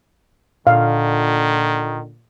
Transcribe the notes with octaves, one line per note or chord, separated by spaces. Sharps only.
A#2 D3 D#3 F5